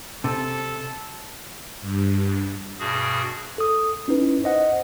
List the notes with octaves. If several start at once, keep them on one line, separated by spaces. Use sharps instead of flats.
C3 A4
G2
G2 B2 F#4 G#4
A4 D#6
C#4 D#4 E4 B4
C5 D#5 F#5